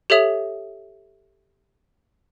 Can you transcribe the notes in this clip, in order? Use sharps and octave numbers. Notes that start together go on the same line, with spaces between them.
G4 A4 C#5 E5 D#6 F7